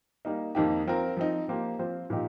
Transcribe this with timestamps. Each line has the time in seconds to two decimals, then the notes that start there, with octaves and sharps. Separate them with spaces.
0.25 G3 A#3 D#4
0.55 F2 D#3 A#3 D#4 G4
0.86 F3 C4 F4 A#4
1.17 F3 C4 D#4
1.48 F3 A#3 G4 C5
1.79 F3 C4 F4 C5
2.10 A#2 F3 D#4 G4